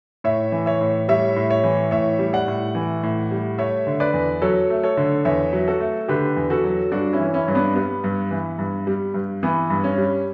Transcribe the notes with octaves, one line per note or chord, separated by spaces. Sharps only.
A2 C#5 E5
E3
C#5 E5
A2
G3 C#5 E5
A2
C#5 E5
E3
A2 C#5 E5
G3
D5 F#5
A2
E3
A2
G3
A3 C#5 E5
D3
B4 D5
E2
F#3 A4 C#5
A3
A4 C#5
D3
E2 C#5 E5
F#3
F#4 A4
A3
D3 G4 B4
E2
F#4 A4
F#3
G2 D4 F#4
C#4 E4
E3
C#4 E4
G2
B3 D4
G3 B3
G2
E3
G2
G3
G2
E3 B3
G2
C#4
G3